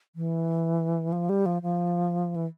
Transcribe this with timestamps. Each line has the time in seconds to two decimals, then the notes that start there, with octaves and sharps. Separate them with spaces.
0.16 E3
1.12 F3
1.29 G3
1.46 F3
1.62 F3
2.36 E3